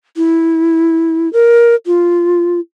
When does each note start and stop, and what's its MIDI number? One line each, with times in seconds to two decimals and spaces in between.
0.17 1.31 64
1.33 1.75 70
1.86 2.60 65